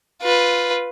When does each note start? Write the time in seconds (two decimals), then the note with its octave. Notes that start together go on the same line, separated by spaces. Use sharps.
0.22 F4 B4